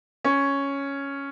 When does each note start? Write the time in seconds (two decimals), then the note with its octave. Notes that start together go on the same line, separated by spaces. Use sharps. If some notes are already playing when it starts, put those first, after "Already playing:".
0.25 C#4